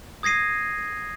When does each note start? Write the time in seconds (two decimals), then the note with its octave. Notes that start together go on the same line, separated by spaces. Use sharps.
0.23 D#6 G#6 A#6 C7 D#7